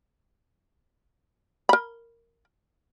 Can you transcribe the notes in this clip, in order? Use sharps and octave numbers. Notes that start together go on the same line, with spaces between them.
A#4 B5